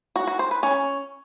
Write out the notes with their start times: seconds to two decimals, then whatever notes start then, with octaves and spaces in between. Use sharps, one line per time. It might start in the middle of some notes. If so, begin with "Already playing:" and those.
0.16 F#4
0.27 F#4
0.39 C5
0.51 B4
0.63 C#4